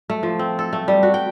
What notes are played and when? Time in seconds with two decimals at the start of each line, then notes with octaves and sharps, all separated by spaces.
0.10 A3
0.23 F3
0.39 C4
0.59 A4
0.73 A3
0.88 G3
1.03 F#4
1.14 G5